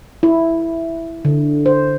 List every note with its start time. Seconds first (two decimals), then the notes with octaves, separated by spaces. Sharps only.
0.23 E4
1.25 D3
1.66 C5